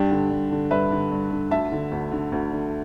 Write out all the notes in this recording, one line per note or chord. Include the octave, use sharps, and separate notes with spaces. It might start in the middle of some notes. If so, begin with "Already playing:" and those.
Already playing: G2 D4 G4
D3
G2
D3
G2 B4 E5
D3
G2
D3
D2 E5 A5
D3
D2
D3
D2
D3